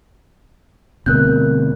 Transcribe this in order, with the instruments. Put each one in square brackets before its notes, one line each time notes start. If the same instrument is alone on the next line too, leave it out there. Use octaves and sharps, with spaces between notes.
[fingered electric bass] D2 B2 C4 [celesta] A#4 F#6 G6